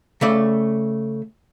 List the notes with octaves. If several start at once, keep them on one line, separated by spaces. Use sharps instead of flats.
C#3 A3 D5